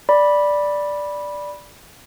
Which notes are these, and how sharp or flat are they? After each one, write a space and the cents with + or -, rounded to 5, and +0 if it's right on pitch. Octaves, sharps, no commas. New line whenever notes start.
D5 +0 B5 -10